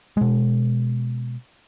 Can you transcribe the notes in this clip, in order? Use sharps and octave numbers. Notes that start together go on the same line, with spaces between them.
B2 G#3